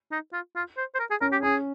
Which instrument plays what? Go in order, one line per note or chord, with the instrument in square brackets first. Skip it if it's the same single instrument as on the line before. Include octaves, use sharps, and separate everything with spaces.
[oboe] D#4
F4
F4
C5
C5
A#4
G#4
[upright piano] C#4 [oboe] A#4
[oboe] G4
[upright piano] C#4 [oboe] G#4